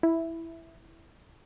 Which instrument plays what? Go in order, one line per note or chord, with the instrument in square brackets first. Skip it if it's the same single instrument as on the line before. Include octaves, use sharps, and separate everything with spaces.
[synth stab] E4